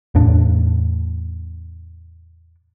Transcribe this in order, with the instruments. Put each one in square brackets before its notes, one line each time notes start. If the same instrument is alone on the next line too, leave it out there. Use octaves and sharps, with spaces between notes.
[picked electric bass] E2 A2 D4